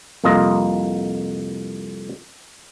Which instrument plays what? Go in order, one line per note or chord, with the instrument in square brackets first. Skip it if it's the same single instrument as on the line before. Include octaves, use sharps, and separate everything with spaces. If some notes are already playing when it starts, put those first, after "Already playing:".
[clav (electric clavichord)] C2 F2 A#3 F4 D#5